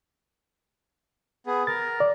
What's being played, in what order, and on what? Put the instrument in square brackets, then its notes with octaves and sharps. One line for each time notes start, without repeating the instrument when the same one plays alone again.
[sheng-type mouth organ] B3 G#4
[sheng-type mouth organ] A#4 [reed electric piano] A6
[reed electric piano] D5